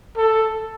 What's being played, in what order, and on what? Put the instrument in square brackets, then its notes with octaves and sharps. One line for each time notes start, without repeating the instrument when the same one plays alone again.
[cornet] A4